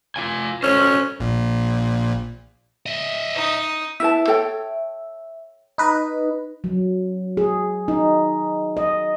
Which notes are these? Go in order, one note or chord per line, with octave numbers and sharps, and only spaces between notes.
F4 F5 G#5
C#4 F#4 A4 C5
A#1 A#2
D#5 E5
D#4 D#6
E4 B4 E5 A5
A4 C#5 G5
D#4 B4 D#5
F#3
G#4
D#4
D#5